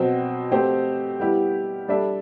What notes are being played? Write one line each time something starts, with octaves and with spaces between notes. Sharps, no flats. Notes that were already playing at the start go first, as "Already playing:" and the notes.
Already playing: B2 F#3 C4 F#4
A3 C4 G4 C5
G3 B3 E4 G4
G3 D4 A4 E5